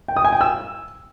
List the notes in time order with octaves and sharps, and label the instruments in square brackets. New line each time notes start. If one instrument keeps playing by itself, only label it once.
[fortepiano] G5
D#6
G#5
G5
E6